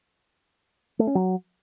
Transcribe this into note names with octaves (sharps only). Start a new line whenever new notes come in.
A3
C#4
F#3